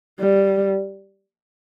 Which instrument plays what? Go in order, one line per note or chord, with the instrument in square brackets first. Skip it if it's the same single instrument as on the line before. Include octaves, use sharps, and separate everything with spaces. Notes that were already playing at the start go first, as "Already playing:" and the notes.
[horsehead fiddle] G3